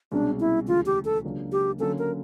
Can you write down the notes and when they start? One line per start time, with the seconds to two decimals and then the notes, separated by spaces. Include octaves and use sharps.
0.12 C2 B2 G#3 C#4 D4
0.40 E4
0.67 D2 C#3 E3 G#3 F4
0.86 G4
1.05 A4
1.24 C#2 C#3 F#3 A#3 D4
1.52 G4
1.79 D3 F#3 A#3 C#4 A4
1.99 A#4